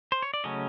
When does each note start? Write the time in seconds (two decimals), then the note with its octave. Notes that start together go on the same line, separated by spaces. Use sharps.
0.12 C5
0.22 C#5
0.34 D5
0.44 C#3 F#3 A3 C#4 C#5 D#5